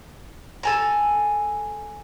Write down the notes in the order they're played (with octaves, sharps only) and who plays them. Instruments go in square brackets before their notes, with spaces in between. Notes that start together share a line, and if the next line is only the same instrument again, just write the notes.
[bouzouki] A4 G#5 A#5